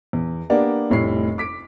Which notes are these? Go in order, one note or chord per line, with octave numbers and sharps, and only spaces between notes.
E2
A#3 B3 D4 G4 F#5
F1 A2 G3 C7
D6 B6 D7